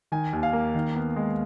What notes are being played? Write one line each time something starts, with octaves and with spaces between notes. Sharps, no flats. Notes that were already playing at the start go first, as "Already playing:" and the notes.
D#3 G#5
D#2
F5
A#3
D#3
B3
G#3